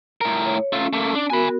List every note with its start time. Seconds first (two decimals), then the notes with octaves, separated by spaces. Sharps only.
0.21 A2 A#4
0.45 C#5
0.73 A3 C#4 F4
0.93 A3 A#3
1.15 D4
1.30 B3 F#4 A#4 G#5 B5